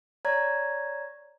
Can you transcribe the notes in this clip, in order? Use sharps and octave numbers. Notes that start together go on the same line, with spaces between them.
C#5 D5 A#5 G#6